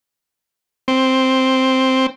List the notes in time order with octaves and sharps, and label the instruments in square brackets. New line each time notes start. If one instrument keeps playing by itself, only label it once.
[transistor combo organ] C4